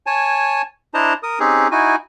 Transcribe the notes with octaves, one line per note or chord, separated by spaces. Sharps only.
C#5 G#5 A5
D4 E4 C5 D#5 A5 A#5
A#4 D#6
C4 C#4 D#4 G4 G#4
D#4 E4 F#4 G#5